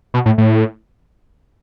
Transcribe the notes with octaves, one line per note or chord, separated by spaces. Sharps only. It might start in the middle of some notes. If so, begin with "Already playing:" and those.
B2
A2
A2